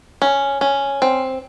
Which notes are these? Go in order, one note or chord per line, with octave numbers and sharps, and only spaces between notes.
C#4
C#4
C4